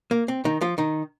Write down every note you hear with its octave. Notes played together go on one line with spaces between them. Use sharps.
A#3
C4
D#3 D#4
F3 F4
D#3 D#4